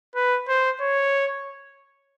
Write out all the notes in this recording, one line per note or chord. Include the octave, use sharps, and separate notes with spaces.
B4
C5
C#5